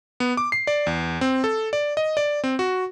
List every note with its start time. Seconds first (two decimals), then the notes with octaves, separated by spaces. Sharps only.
0.20 B3
0.37 D6
0.52 C7
0.67 D5
0.87 E2
1.21 C4
1.44 A4
1.73 D5
1.97 D#5
2.17 D5
2.44 C4
2.59 F#4